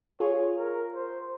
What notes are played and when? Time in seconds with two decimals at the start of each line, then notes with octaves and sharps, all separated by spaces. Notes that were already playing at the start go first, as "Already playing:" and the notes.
0.20 F4 G#4 C#5
0.58 A#4
0.94 C5